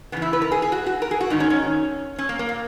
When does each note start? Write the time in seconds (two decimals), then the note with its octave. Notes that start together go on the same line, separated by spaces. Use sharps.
0.12 E2 C#3 E3 B3
0.22 E4
0.33 B4
0.42 A#4
0.52 G#4
0.62 G#4
0.72 F#4
0.86 F#4
1.02 A#4
1.11 G#4
1.21 F#4
1.30 G#2 D#3 D#4
1.40 C#4
1.50 C#4
2.19 C#4
2.29 A#3
2.39 A#3
2.49 A#2